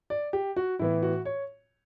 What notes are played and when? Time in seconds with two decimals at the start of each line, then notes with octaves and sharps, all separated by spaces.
0.10 D5
0.33 G4
0.56 F#4
0.79 A2 E3 B3 E4
1.03 F#4
1.25 C#5